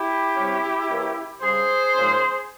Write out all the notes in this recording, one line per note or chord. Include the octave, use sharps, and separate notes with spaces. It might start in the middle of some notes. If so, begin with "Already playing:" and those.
Already playing: E4 G4
C3 G3 C#4
E3 A#3 C#4
C#3 G3 C#4 G#4 C5
G#2 F3 A#3 C#4